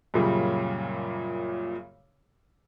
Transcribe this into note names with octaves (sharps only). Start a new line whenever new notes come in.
F#2 A#2 C#3 G3